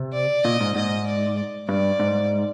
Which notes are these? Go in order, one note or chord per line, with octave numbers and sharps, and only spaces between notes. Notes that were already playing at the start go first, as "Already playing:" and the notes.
Already playing: C3
D5
A#2 D#5
G#2
G#2 D#5
D5
G2 D5
G#2